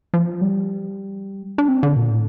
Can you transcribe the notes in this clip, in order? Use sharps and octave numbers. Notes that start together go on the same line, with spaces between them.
F3
G3
D4
C4
D3
A#2
A2